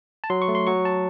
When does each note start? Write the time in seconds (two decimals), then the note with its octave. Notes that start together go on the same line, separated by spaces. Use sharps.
0.24 A5
0.30 F#3 C6
0.42 C#6
0.48 A3
0.55 C6
0.67 F#3 C#6
0.85 A5